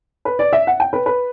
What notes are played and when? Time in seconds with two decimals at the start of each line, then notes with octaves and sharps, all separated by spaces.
0.25 B4
0.39 D5
0.53 E5
0.67 F#5
0.80 G5
0.93 B4
1.06 B4